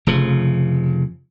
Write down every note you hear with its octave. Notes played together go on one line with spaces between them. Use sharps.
F1 C#3 F3